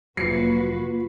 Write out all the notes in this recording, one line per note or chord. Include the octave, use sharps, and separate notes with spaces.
F1 F#3 A#3 F4 F#4 B4 C7 C#7